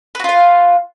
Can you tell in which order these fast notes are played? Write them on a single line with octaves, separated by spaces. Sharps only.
B4 F#4 F4 F5